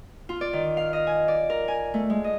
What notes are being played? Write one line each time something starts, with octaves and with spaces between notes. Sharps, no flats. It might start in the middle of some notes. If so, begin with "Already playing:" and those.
F4
D5
D#3
F5
D#5
G#5
D5
A#4
G#5
A3
G#3
D#5